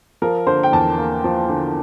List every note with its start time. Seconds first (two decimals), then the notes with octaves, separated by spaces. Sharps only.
0.22 F3 A#4
0.47 D3 C5
0.63 G5
0.72 E2 A5
0.98 A#3
1.24 F3
1.49 D3